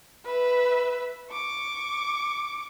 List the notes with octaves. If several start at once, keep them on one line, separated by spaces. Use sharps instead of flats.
B4 E5
C#6 D6